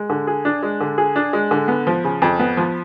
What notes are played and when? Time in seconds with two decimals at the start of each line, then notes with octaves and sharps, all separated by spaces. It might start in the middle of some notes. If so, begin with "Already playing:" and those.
Already playing: G#3
0.10 D3
0.27 G#4
0.45 D4
0.63 G#3
0.81 D3
0.98 G#4
1.16 D4
1.33 G#3
1.51 D3
1.68 B3
1.87 F3
2.04 C#3
2.22 F2
2.39 B3
2.57 F3